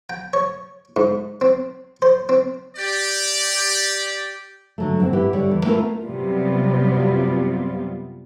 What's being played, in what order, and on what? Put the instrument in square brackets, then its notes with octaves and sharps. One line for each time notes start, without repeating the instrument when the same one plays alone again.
[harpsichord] G5
C#5
G#2
C4
C5
C4
[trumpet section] G4 D5
[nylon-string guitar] D3 F#3 A3
F#2 A#3 C4
E4 G4 B4 E5 F#5
D3 G3 C#5
E2
A3 B3 C#4 E4 F4 A#4
[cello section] F#2 C3 F#3 G3 B3 F4